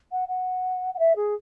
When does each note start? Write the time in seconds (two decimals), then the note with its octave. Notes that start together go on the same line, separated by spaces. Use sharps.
0.12 F#5
0.28 F#5
0.94 F#5
0.99 E5
1.16 G#4